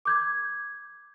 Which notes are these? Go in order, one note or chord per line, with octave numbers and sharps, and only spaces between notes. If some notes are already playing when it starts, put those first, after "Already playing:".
D6 G6 G#6